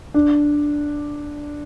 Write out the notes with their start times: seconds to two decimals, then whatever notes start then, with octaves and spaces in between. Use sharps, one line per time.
0.14 D4